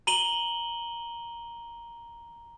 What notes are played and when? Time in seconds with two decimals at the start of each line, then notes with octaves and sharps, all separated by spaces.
0.07 A#5 D#7 F#7 G7